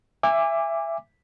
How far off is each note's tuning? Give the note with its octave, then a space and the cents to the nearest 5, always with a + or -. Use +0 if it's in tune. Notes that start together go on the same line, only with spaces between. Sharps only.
E5 +15 G#5 -30 D6 +0